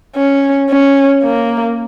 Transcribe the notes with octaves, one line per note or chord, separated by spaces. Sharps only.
C#4
C#4
A#3